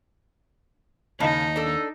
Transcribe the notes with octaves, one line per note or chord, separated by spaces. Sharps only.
D#2 C#3 D#4 D#5 F#5 A5
D4 A4